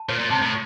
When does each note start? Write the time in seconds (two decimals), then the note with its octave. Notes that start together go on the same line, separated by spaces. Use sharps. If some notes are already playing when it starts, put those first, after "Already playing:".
Already playing: A5
0.09 A#2 C#5
0.20 A#2
0.30 C3 A5
0.42 A2